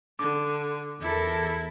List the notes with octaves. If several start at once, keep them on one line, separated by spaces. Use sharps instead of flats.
D3 D6
E2 E4 A4 A#4